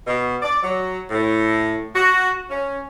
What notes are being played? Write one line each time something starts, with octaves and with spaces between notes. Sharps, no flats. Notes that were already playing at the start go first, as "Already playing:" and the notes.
B2
D5
F#3
A2
F#4
C#4